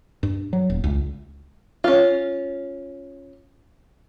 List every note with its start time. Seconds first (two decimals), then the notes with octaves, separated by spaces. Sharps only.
0.23 G2
0.53 F#3
0.70 D#1
0.84 C#2
1.84 C#4 F4